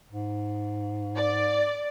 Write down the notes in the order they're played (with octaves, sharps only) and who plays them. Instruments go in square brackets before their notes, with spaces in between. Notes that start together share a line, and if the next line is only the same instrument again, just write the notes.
[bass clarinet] G#2
[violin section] D5